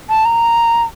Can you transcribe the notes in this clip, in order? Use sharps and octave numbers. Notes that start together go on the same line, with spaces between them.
A5
A#5